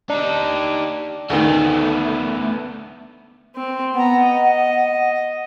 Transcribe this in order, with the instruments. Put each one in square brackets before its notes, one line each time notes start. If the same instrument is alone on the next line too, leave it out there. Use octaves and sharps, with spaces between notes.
[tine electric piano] D4 [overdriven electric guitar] D#4 G4
[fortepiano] D2 D#3 [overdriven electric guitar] A3 B3
[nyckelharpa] C4
[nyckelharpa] B3 A#5 [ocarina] F#5
[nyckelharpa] D#5